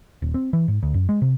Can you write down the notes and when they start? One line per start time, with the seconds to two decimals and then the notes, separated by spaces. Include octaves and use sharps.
0.22 D#1
0.34 C4
0.53 E3
0.68 G#2
0.83 D2
0.94 F#2
1.09 G#3
1.22 C3